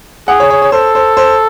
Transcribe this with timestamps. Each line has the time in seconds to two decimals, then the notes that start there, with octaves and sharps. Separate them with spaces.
0.28 G#4 F#5
0.40 C#5
0.51 C#5
0.62 C#5
0.72 A4 C5
0.95 C5
1.17 C5